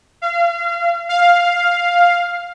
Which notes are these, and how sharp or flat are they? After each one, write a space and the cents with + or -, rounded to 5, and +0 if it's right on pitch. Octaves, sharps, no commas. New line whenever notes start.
F5 -30
F5 +5